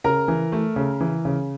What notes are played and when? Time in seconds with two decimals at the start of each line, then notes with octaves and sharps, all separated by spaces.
0.04 C#3 A#4 A#5
0.28 E3
0.52 A3
0.76 C#3
1.01 E3
1.25 C#3